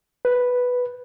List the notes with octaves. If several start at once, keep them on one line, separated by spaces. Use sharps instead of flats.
B4